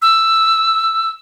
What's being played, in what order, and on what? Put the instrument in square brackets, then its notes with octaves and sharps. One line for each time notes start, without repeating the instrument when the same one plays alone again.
[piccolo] E6